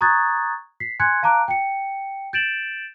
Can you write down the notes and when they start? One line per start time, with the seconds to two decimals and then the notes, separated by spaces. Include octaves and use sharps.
0.01 A#5 C#6 D#6 F#6 G#6 A6
0.80 B6 C7
0.99 G#5 C6 F#6 G#6 C#7
1.23 F5 A5 A#5 D6 F#6 D7
1.48 G5 C#7
2.33 G6 A6 D7 E7 F#7